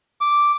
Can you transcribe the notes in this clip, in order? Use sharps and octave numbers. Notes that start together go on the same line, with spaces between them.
D6